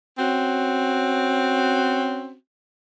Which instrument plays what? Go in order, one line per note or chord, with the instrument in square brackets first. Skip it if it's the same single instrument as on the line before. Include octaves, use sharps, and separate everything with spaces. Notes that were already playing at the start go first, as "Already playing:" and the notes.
[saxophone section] C4 C#4 F#4